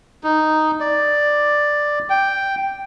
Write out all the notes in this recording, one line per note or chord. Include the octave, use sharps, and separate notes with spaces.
D#4
D5
G5